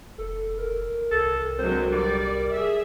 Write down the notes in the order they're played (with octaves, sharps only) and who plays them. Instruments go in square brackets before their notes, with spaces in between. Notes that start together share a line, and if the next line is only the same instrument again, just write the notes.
[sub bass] F1 [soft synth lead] A4
[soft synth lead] A#4
[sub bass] C2 [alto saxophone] A4
[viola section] D3 F#3 G#3 [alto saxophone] C4
[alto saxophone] G3 [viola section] D5
[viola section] G#4 E5